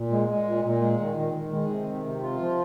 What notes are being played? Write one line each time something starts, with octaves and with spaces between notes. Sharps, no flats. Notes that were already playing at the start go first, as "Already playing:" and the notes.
Already playing: A#2
G#3
G#3
A#2
A#2
G#3
D#3
D#3
D#3
G#3
C3
D#3
C3
F4
F3